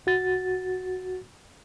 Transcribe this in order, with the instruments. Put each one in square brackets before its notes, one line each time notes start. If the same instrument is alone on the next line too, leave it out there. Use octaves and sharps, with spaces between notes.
[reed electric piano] C2 F#4 A6